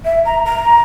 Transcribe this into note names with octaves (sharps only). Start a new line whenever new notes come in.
E5
A#5
A#5